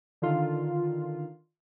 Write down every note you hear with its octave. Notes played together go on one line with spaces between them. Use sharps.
D3 D#3 F4